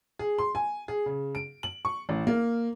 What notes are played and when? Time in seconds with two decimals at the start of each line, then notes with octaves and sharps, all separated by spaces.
0.19 G#4
0.38 C6
0.55 G#5
0.88 G#4
1.06 C#3
1.35 D7
1.63 F#7
1.85 C#6
2.09 A1
2.27 A#3